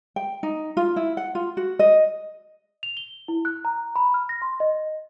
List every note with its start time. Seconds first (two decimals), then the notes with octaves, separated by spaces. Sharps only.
0.16 G5
0.43 D#4
0.77 F4
0.96 E4
1.17 F#5
1.35 F4
1.57 F#4
1.79 D#5
2.83 F7
2.97 G7
3.28 E4
3.45 F#6
3.65 A#5
3.96 B5
4.14 F6
4.29 A#6
4.42 C6
4.60 D#5